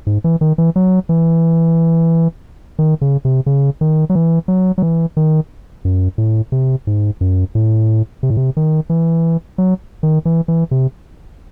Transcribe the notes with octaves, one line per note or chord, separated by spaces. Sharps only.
G#2
E3
D#3
E3
F#3
E3
D#3
C#3
C3
C#3
D#3
F#3
E3
F#3
F#3
E3
D#3
F#2
A2
C3
G#2
F#2
A2
C3
A2
C3
D#3
E3
F#3
D#3
E3
E3
C3